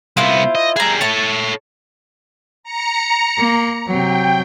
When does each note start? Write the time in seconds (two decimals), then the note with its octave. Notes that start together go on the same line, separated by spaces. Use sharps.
0.17 C2 B3 E4 F4 C5
0.55 D#5
0.76 G3 G#4 E5 A#5
1.01 A3 A4 C#5 A5
2.63 A#5 C#7
3.38 A#3
3.87 C3 F#3 G5